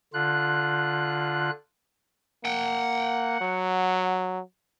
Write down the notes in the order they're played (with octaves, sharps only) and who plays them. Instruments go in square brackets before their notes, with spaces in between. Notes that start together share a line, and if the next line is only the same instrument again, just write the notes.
[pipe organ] D3 F4 F#6
[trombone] A#3 [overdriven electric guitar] F#5 G5
[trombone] F#3